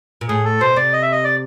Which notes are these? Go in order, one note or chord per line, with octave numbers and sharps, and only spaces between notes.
A#2
A2 G#4
A4
B2 C5
C3 D5
D#5
E5
D#5
D5